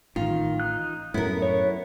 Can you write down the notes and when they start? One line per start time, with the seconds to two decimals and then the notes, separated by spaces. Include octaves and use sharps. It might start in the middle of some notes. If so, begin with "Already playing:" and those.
0.16 A1 D#3 F4
0.60 D#4 F#6
1.14 F#2 A2 B3 E4 A#4
1.42 C#5